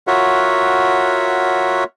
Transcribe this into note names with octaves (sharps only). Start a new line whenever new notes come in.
F4 F#4 A#4 C#5 E5 F#5